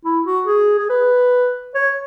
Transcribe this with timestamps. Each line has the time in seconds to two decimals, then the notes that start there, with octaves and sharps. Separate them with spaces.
0.05 E4
0.26 F#4
0.47 G#4
0.79 G#4
0.90 B4
1.75 C#5